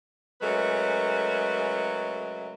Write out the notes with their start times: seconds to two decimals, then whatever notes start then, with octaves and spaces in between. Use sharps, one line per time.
0.41 C#3 F#3 G#3 A3 A#4 B4